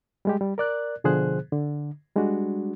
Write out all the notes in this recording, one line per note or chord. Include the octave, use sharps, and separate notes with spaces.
G3 G#3 G4
G3
A#4 D5 F#6
B2 D3 F3 G#4 C5 F#6
D3
G3 G#3 D4 F#4